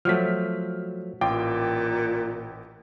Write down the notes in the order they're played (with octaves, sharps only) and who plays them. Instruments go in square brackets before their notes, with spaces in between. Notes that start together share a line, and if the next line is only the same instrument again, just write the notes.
[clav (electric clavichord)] F3 F#3 A3 [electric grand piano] F6 B6
[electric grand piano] A1 G5 D6 [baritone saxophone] A#2 [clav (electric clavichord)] F4